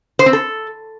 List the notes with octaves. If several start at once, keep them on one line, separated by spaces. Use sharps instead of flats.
C5
C4
A4